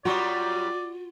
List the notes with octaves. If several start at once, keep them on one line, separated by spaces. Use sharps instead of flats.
F#2 F#3 G3 F4 F#4 D5